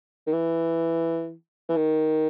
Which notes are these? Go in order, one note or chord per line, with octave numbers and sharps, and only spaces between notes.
D#3
E3
E3
D#3